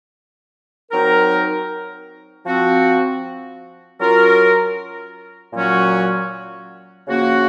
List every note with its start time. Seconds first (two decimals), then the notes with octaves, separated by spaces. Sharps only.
0.92 F#3 C4 D#4 A#4
2.45 F3 C4 F#4
4.00 F#3 C#4 F4 A#4
5.53 A#2 F#3 C#4 F#4
7.07 C#3 F3 A#3 C#4 F#4